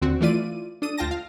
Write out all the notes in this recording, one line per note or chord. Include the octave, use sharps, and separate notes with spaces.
D#2 D3 C4 F#4
E3 A3 E4 F4 D5 D#7
D4 A4 D#6 D#7
D2 F4 G5 A5 A#6
F5